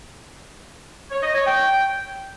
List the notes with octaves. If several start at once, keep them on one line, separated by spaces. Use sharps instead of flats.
C#5
D#5
C#5
G5